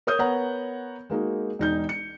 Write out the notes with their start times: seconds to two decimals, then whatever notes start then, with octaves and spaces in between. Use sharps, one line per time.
0.07 A#4 C#5 D#6 G6
0.19 B3 A#4 C#5 F#5 A#5
1.10 G#3 A#3 D#4 F#4
1.59 E1 D#4 G6
1.89 C#7